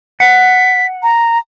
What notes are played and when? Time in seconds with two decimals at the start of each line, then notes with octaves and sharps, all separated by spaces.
0.20 F#5 B6
1.03 A#5